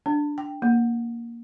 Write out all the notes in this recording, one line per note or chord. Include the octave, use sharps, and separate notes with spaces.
D4
G5
A#3